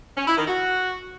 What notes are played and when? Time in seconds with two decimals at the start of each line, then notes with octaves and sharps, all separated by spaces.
0.17 C#4
0.27 E4
0.37 D#3
0.48 F#4